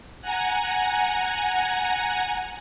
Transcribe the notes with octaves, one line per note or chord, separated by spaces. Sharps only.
F#5 G#5 A#5